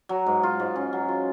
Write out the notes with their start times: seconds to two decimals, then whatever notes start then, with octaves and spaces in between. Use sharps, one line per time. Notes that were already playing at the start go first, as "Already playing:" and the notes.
0.09 F#3
0.26 G#2
0.43 F4
0.60 G#2
0.76 C#4
0.93 F#3
1.08 F4